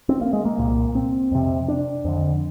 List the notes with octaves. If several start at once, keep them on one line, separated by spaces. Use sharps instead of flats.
C4
A#3
G#3
A#3
C2 A#2
C4
F2 C3
D4
F2 D3